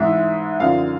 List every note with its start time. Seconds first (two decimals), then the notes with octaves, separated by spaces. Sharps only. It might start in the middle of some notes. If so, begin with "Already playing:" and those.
Already playing: G#2 E3 G#3 E5
0.60 F#2 D3 F3 F5